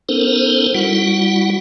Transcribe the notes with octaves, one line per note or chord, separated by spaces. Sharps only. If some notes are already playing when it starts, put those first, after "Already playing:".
B3 C#4 D#4 A4 A#4 C5
G3 E4 F#4 F#5